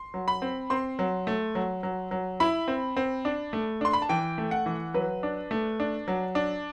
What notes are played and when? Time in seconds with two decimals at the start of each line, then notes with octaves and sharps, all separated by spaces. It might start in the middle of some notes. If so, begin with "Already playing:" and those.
Already playing: C6
0.14 F#3
0.28 B5
0.42 C4
0.70 C4 C6
0.99 F#3
1.27 A3
1.55 F#3
1.83 F#3
2.11 F#3
2.40 E4 B5
2.68 C4
2.97 C4
3.25 D4
3.53 A3
3.81 D4 C6
3.93 B5
4.02 A5
4.09 E3 G5
4.38 A3
4.51 F#5
4.66 E3
4.94 F#3 B4
5.23 D4
5.51 A3
5.80 D4
6.08 F#3
6.35 D4